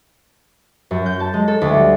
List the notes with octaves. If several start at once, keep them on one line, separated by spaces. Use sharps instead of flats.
F#2
G6
A5
G#3
A4
D2
G3